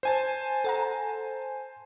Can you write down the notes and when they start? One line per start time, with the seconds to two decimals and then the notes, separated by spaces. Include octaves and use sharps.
0.03 C5 G#5 A5
0.64 A4 F#5 A#5